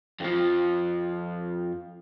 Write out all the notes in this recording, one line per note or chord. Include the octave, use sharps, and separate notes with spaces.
F2 F3